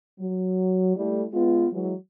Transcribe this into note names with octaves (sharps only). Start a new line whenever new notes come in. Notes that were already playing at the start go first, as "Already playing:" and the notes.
F#3
G3 A3 E4
G#3 B3 F4
E3 F#3 G#3